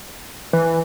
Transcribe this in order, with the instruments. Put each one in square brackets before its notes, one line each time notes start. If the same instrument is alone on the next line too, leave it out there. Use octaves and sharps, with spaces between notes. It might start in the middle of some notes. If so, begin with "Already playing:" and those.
[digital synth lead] E3